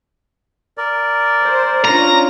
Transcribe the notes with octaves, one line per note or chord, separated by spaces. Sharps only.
A#4 D5
C5
C#4 D4 F4 A#5